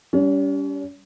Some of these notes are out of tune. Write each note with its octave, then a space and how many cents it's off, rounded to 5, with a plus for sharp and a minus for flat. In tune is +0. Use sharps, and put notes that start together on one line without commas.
G3 +0 C#4 +40